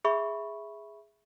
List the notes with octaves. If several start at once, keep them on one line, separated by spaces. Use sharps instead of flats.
G#4 E5 B5 C#6